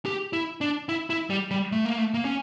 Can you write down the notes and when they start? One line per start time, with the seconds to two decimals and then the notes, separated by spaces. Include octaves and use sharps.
0.06 G4
0.33 E4
0.61 D4
0.89 E4
1.10 E4
1.30 G3
1.51 G3
1.72 A3
1.85 A#3
1.98 A3
2.14 A#3
2.25 C#4